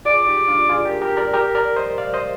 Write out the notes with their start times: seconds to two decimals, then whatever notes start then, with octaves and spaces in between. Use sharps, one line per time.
0.05 F4 G#4 D5
0.27 D#4 G4
0.48 D4 F4
0.69 F4 G#4
0.85 G4 A#4
1.01 G4 A#4
1.17 A#4 D5
1.34 G4 A#4
1.55 A#4 D5
1.76 C5 D#5
1.98 D5 F5
2.14 C5 D#5